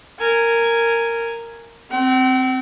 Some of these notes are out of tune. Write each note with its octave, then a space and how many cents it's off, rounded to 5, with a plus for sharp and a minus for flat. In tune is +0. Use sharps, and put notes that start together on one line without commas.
A#4 -10 G#5 +0
C4 +0 G5 -45